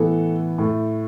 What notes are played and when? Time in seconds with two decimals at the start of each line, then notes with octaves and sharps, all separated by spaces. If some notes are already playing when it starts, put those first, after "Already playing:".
Already playing: A2 E3 B3 A4
0.58 A2 A3